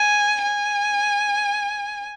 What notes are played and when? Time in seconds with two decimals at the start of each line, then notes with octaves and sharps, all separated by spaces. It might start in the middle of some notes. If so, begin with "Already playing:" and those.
Already playing: G#5
0.42 G#5